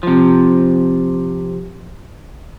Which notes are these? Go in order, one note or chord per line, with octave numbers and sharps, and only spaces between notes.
C3 F3